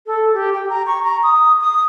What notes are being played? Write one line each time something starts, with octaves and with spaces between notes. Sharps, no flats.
A4
G4
G5
A#5
C#6
A#5
D#6
D#6